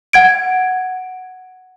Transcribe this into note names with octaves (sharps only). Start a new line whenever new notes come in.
F#5 G#6 D7